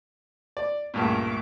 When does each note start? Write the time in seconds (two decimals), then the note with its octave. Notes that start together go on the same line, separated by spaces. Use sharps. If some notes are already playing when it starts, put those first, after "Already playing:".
0.57 D5
0.94 C#2 G2 A#2 A3 D6